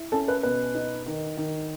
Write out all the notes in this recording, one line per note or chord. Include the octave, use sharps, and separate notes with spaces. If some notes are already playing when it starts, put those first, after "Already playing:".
Already playing: E4
C#4 A4
B4
B2 B4
D#4
D#3
D#3